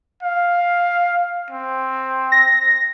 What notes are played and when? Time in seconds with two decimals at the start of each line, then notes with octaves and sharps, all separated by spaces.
0.23 F5
1.51 C4
2.32 A#6